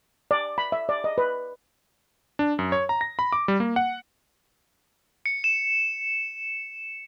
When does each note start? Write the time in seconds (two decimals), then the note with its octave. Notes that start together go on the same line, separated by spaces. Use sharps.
0.31 D5
0.58 B5
0.72 E5
0.89 D5
1.04 D#5
1.18 B4
2.39 D4
2.59 F#2
2.72 C#5
2.89 A#5
3.01 A#6
3.19 B5
3.32 D6
3.48 G3
3.60 A#3
3.76 F#5
5.26 C#7
5.44 E7